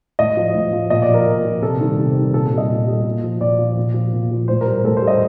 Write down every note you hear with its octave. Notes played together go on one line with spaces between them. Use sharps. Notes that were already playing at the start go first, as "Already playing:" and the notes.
A2 D#5
F3
A2
F3
A#2 D#5
D5
F3
A#4
A#2
F3
C3 A4
D#3 G3
C3
D#3 G3
A#2 A4
A4
G3
D#5
A#2
G3
A#2
F3
A#2 D5
F3
A#2
F3
A#2
F3
A2 C5
A#4
G3
A#4
A2 A4
G3 C5
D#5